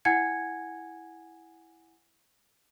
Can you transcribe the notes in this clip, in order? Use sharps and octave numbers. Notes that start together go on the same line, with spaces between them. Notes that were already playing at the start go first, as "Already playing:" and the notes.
E4 F#5 G#5 G#6 C#7